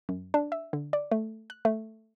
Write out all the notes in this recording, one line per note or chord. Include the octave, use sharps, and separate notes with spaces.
F#2
D4
E5
D3
D5
A3
F#6
A3